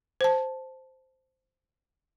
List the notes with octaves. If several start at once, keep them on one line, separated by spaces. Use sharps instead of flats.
C5 A5